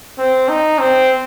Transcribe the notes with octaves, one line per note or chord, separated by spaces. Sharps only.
C4
D#4
C4